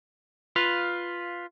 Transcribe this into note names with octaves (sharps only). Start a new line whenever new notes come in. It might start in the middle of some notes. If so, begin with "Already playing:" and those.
F4 B4 F5